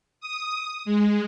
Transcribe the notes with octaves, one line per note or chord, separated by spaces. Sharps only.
D#6
G#3